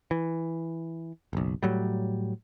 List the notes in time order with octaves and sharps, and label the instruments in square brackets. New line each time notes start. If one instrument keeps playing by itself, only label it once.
[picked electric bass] E3
F#1 B1
A2 F#3 G3